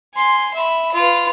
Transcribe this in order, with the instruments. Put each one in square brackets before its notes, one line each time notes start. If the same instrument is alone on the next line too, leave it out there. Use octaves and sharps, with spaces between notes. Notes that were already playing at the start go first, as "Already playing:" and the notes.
[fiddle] G#5 C6
E5 B5
F4 B4